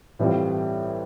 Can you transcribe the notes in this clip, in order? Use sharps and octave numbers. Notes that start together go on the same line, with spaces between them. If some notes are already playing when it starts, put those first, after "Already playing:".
A2 E3 G3 C4 F4